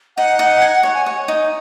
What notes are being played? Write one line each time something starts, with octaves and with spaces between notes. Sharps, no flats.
D#4 F#5
D#4
G#5
C#5 F#5
G#5
C#5 F#5
D#4